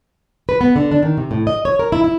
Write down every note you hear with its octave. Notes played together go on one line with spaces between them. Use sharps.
B4
B3
D3
D4
D#3
C3
A2
D#5
C#5
A#4
E4
E4